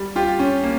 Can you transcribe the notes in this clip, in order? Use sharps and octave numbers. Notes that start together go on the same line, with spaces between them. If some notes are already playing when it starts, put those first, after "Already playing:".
Already playing: G3
F4 G4
C#4
A#3